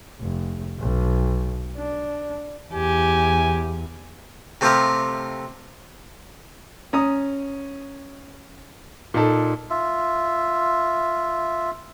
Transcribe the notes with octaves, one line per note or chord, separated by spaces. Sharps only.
F1
B1
D4
E2 G4 G#5
C3 A3 C4 F4 G4 A#4
C#4 A#5 D#6
A#2 D#4 A4
F4 E5